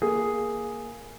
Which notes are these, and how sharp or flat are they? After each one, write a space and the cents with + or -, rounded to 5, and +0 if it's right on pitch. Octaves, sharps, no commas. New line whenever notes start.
A#3 +5 G#4 +0